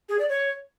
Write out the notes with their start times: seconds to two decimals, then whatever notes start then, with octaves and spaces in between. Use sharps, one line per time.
0.09 G#4
0.19 D5
0.29 C#5